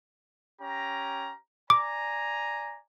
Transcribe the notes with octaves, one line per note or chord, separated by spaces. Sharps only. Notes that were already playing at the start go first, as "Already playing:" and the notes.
C#4 G4 A#5
D5 G#5 A#5 D6